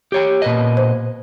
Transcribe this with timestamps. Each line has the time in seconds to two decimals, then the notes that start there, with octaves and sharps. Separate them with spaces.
0.12 G4 C#5 G5
0.42 A#2 B4 D#5
0.77 C5